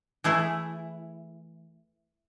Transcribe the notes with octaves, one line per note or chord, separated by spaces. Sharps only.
E3 A3 E4 G#4